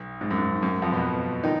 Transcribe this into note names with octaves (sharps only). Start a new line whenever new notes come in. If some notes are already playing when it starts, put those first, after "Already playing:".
Already playing: B1
G#2
F#2
G#2
F#2
F2 F3
B2 B3
D#3 D#4